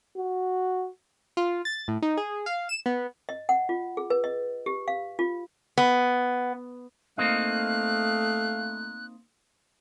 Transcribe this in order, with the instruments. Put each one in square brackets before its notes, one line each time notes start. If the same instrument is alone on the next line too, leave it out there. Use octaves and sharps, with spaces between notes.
[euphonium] F#4
[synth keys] F4
A6
A2
D#4
G#4
F5
E7
B3
[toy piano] D#5
F#5
F4
G#4
B4
D#5
G4
F5
F4
[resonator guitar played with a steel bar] B3
[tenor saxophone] A3 [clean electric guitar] A#3 C4 D#4 [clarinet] F5 [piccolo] F#6